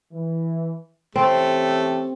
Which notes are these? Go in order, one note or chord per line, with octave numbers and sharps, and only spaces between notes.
E3
E3 A3 C4 C#4 G4